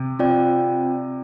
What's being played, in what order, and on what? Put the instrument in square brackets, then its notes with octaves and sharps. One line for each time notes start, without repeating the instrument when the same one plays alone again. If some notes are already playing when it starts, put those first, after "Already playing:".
Already playing: [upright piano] C3
[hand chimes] C4 F4 D5 G5